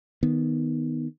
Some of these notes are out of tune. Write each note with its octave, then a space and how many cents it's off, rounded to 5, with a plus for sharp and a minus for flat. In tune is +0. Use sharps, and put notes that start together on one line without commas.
D#3 +0 B3 +0